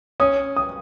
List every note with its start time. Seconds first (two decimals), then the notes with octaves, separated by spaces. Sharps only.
0.20 C#4 D#6
0.56 D#6